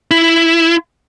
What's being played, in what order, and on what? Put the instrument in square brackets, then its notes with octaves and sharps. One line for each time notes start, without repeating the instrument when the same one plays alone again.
[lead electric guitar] E4